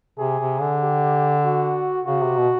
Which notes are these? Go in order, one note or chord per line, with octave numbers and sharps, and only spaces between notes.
C3 G#4
C3
D3
G4
F#4
C#3 F#4
C3
B2